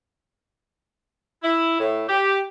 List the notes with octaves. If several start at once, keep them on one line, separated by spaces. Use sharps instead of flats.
E4
A2
G4